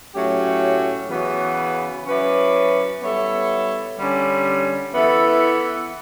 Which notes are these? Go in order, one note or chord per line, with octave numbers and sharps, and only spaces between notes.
A2 F#3 A3 C#4 G4
C#3 E3 B3 F#4
F#3 C#4 E4 B4 D5
G3 B3 E4 A4 C#5
D3 G3 C#4
E3 B3 E4 A4